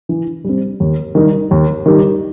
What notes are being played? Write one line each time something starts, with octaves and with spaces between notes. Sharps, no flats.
E3
G3 C4
D#2
D#3 G3 D#4 G4
D#2
D#3 G3 D#4 G4